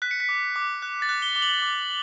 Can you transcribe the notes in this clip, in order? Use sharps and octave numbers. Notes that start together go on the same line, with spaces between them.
F#6 B6
C#7
B6
D6
D6
F#6
A6
F#6
G7
D6 G7
F#7
D6